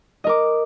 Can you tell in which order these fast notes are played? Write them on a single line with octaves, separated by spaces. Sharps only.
D#5 A#4 D6